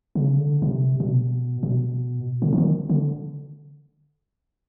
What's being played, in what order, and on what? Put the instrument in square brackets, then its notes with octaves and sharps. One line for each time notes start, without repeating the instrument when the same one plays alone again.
[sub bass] C#3
D3
C#3
C3
B2
B2
D3
E3
D#3
D3